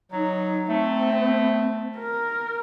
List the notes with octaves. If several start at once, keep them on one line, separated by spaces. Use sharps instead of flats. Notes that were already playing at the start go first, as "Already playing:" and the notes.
F#3 D#4
A3 C4
A#4